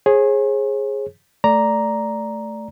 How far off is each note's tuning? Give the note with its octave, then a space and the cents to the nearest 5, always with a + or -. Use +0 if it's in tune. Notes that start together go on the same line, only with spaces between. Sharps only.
G#4 +0 C#5 -45
A3 +0 D5 -5 A#5 +0